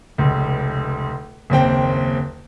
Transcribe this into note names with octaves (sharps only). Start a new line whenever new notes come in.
F1 C#2
F#1 D#2 C4 G5